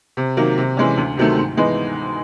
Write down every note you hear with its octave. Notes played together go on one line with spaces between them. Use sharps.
C3
D#3 F#3 A#3
C3
E3 G#3 C#4
D2
C3 D#3 F#3 A3
G#2
E3 G#3 B3 D#4